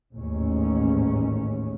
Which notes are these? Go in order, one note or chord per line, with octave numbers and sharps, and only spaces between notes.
A1 D#2 G#2 C#4